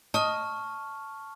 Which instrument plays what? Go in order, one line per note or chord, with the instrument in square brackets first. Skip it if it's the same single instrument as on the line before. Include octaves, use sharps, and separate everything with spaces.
[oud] D#5 [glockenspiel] A5 C#6 F6